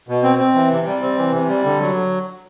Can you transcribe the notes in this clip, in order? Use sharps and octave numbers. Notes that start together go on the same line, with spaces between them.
B2
C4
C4
E3
C3
G3
C4
E3
C3
G3
D3
F#3